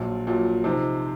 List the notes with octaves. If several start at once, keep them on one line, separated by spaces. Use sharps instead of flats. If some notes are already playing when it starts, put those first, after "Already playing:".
Already playing: A#1 A#2 F#3
A#1 A#2 F#3
C3 F3 C4 D#4